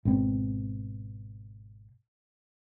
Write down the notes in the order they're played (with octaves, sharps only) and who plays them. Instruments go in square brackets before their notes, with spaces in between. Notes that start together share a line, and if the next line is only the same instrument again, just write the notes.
[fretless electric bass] G#1 B2 C4